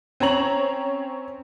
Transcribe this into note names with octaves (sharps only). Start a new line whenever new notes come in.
C4 C#4 C#5 A#5 F#7